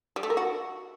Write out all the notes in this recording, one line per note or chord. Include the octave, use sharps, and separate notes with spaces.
G3
A3
A#4
F#4